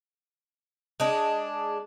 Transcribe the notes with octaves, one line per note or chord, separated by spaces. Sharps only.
G#3 D4